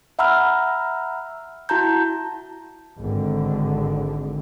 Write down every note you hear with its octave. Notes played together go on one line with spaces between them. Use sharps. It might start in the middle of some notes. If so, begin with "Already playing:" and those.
E5 F#5 A#5 B5 E6 F6
E4 F#4 A5 A#5 G6
G#1 D3